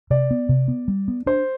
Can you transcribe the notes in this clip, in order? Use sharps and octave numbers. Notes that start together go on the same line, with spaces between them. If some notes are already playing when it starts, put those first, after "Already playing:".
C3 D5
B3
C3
B3
G3
B3
D4 C5